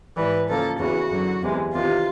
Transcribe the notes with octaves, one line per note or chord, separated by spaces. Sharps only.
G#2 E3 G3 B4
C#3 F3 A#3 A4
E2 C#3 E3 F#4
F#2 D3 F#3
E2 C3 E3 G#3
E2 C3 D#3 F4